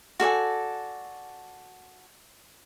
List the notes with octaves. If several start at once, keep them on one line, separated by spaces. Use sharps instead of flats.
F#4 A4 D5 G#5